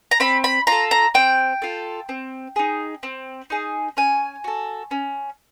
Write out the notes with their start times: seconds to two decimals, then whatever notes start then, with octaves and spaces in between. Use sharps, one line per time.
0.11 A#5
0.20 C4 B5
0.44 B5
0.67 F4 A4 A#5
0.91 A#5
1.14 C4 G5
1.62 F4 A4
2.09 C4
2.56 D#4 G#4
3.03 C4
3.50 D#4 G#4
3.97 C#4 G#5
4.44 F#4 A4
4.91 C#4